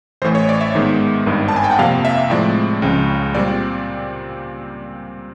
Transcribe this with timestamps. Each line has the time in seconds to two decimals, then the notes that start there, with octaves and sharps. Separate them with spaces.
0.22 A1 C5
0.24 A2 E3
0.35 C#5
0.49 D5
0.61 E5
0.75 G#2 D#3 G#3 B3
1.26 G#1 G2 D#3
1.48 A5
1.56 G#5
1.64 G5
1.71 F#5
1.78 F2 C3 F3 A#3 F5
2.05 E5
2.30 A2 F3 G#3 C4 D5
2.82 C#2 C#3 F3
3.35 A#2 G3 C4 D5